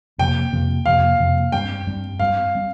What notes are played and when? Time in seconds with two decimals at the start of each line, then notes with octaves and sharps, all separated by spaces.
0.18 F2 C3 F3 A#3 G5
0.52 F2 C3 F3 A#3
0.86 F2 C3 F3 A#3 F5
1.19 F2 C3 F3 A#3
1.52 G2 G3 C4 G5
1.87 G2 G3 C4
2.20 G2 G3 C4 F5
2.55 G3 C4